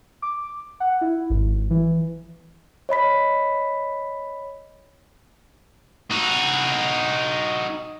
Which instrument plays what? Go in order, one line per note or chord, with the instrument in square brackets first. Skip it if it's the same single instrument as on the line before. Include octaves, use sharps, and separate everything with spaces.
[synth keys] D6
F#5
E4
G#1
E3
[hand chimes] C#5 D#5 B5 B6
[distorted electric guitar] D#4 F#4